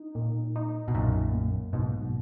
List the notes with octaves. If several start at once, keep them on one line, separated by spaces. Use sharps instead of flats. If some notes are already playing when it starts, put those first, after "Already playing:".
Already playing: D#4
A#2
D#4
B2
B1 F#2 A#2
A#3
B1 G#2 B2